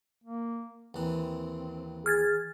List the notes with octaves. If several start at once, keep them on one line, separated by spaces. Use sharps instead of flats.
A#3
D#2 E3 C4
G#4 F6 G#6 A6